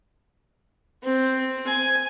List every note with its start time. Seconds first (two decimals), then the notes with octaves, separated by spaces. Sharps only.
1.04 C4
1.67 G#5